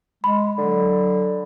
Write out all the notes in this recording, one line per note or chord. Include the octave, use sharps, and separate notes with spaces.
G#3 B5
D3 F#3